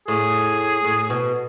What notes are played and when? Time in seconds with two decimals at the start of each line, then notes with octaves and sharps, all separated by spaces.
0.08 A2 G#4
0.84 A2
1.10 B2